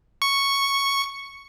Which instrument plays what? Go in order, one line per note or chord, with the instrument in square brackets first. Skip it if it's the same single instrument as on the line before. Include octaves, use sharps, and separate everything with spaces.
[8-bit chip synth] C#6